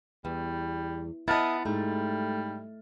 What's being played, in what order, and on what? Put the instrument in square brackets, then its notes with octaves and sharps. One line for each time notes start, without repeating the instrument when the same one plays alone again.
[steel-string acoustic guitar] E2 [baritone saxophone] G3
[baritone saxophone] B3 [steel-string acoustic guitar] E4 D#5 [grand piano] A5 F6 A6
[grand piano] G#2 [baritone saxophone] G3 [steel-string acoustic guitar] A3